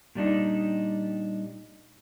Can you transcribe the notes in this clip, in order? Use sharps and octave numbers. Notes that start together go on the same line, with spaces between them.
A#2 G3 D4 D#4